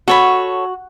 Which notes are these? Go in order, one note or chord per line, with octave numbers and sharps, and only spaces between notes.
F#4 A4 C#5 B5